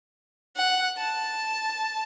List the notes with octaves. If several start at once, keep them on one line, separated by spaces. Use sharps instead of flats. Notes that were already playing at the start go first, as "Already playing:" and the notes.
F#5
A5